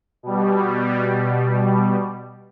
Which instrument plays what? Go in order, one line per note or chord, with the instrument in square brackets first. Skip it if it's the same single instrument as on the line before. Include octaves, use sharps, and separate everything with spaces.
[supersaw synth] B2 G3